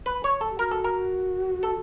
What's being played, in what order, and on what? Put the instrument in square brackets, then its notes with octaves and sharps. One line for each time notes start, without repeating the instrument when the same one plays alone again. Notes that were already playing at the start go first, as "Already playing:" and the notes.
[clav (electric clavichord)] B4
C#5
A4
[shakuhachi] G4
[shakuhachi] F#4 [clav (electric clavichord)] A#4
[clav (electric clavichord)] A4
A#4
A4